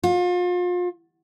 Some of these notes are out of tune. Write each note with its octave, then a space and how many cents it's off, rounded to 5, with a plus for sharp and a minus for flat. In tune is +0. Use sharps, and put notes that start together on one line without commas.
F4 +35